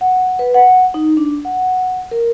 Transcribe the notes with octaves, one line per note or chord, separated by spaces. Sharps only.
F#5
B4
F#5
D#4
D4
F#5
A#4